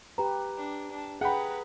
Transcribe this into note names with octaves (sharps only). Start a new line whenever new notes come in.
G4 B4 A#5
D4
D4 A5
G#4 B4 F#5 G5 A#5 B5